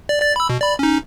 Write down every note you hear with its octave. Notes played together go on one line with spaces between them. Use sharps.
D5
D5 A6
B5 E6
B2
D5 B5
C#4 D#4